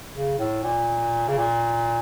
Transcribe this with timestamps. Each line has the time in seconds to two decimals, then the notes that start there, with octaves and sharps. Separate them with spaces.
0.14 C#3
0.38 A2
0.63 A#2
1.28 C#3
1.38 A#2